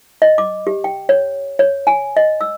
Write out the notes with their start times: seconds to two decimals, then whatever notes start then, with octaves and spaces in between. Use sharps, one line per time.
0.22 D#5
0.38 D6
0.67 G4
0.84 G5
1.09 C#5
1.59 C#5
1.87 G#5
2.17 D#5
2.41 E6